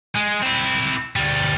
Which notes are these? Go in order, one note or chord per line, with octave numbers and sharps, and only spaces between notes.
G#3
C4 E4
D2 G3